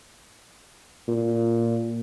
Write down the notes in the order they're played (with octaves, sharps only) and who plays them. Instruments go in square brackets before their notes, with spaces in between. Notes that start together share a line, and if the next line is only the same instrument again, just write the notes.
[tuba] A#2